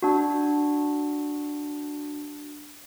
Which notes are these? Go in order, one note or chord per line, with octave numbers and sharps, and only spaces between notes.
D4 F#4